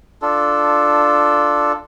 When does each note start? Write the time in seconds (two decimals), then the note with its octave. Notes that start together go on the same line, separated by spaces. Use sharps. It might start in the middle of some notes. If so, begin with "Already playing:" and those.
0.22 D4 F4 A4